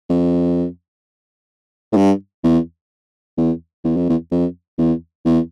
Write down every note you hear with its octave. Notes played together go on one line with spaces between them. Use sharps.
F2
A2
G2
E2
E2
E2
F2
E2
F2
E2
E2